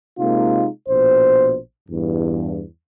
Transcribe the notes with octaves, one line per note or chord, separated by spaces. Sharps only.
C3 G#3 A#3 D#4 F4
A#1 B2 C5
E2 G2